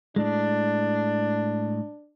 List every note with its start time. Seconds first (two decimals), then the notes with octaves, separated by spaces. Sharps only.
0.16 A2 G#3 D4